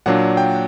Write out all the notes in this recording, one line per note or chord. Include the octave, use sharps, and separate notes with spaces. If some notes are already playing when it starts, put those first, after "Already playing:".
A#2 F#3 A#3 D4 F#5
G5